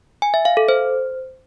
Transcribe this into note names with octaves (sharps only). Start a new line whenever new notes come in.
G#5
E5
F5
A4
C5